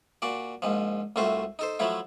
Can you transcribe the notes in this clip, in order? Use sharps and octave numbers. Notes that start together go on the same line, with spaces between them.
A#2 F#4 D5
A#1 G#2 F3
C2 A2 A3 F4 F#4 C5
D#4 A4 C5
F3 F#3 A3 E4 F4